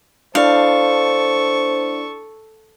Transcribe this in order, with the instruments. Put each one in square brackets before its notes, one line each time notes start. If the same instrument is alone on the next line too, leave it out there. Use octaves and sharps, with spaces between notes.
[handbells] D4 E4 D5 [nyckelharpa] A4 C#6 [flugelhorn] C5 [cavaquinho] F5